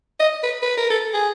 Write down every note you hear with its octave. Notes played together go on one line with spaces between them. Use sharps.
D#5
B4
B4
A#4
A4
G#4